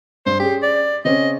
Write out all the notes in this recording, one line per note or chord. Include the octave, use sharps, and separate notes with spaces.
G2 C5
C#4 G4 G#4
D5
C#3 C4 C#4 D#5